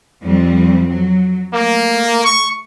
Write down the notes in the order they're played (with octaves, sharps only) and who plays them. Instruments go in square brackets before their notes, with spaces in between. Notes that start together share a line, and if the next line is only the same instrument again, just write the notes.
[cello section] F2 G3 C4
F#3
[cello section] A3 [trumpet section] A#3
[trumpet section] C#6